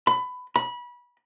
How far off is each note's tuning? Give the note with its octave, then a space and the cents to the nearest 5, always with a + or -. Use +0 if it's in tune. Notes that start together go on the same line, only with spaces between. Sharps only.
B5 +20
B5 -25